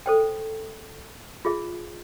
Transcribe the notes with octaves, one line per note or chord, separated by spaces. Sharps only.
A4 C5 G5
F4 G#4 E5